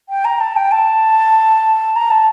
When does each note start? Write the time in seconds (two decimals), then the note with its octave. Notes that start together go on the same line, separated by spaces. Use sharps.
0.09 G5
0.24 A#5
0.40 A5
0.56 G5
0.71 A5
1.96 A#5
2.10 A5